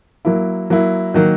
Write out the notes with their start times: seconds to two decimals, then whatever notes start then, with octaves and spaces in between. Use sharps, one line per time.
0.25 F#3 A#3 E4
0.70 F#3 A#3 E4
1.14 D#3 F#3 A#3